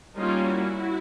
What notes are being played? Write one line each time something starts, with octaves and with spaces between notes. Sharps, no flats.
G3 A#3 C#4 D#4 F4
E4 F#4